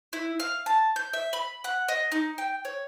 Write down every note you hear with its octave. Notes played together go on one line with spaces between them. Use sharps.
E4
F5
A5
G6
E5
B5
F#5
D#5
D#4
G5
C#5